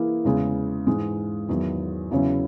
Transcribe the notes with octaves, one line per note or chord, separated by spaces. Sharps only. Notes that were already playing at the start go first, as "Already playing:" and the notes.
Already playing: E3 A#3 E4 G#4
E2 C#3 G#3
G#2 E3 G#3
E2 D#3 F#3
E2 C#3 F#3 C#4 E4